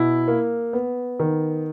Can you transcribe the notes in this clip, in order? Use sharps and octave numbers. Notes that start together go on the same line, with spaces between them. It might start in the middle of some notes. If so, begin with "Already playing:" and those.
Already playing: B2 E4
A#3
B3
D#3